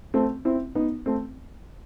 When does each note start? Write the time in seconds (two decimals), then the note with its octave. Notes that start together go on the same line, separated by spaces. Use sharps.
0.14 A3 C4
0.45 C4 E4
0.75 B3 D#4
1.06 A3 C4